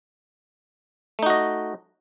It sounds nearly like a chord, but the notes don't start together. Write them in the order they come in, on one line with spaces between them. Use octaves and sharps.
A3 D#4 F#4 D#5